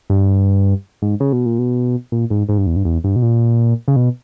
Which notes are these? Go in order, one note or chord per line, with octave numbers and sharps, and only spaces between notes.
G2
G#2
C#3
B2
A#2
B2
A#2
G#2
G#2
G2
E2
G2
E2
G2
B2
A#2
C#3
B2